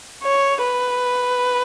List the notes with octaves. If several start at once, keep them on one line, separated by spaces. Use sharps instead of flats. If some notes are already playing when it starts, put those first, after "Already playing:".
C#5
B4